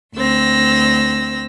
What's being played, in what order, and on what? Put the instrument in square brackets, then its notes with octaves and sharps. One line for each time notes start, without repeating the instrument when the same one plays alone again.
[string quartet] D2 C4 E6 A#6